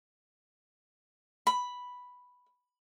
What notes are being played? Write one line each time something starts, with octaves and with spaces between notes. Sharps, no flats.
B5